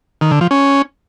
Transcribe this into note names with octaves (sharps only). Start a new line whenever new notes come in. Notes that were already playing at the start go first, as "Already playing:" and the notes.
D#3
D3
F3
C#4